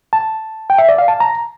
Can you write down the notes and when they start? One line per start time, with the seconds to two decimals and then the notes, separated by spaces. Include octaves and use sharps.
0.13 A5
0.70 G5
0.78 E5
0.89 D5
0.98 F5
1.08 A5
1.20 A#5